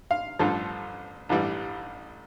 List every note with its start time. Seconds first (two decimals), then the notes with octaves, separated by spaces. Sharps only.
0.11 F5
0.39 A1 G2 F3 A4
1.29 A1 G2 E3 G3